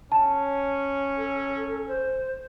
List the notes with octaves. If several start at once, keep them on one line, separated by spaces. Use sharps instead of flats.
C#4 A5
A4
C5